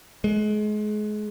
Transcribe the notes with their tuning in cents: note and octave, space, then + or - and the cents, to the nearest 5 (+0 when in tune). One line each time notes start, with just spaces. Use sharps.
G#3 +30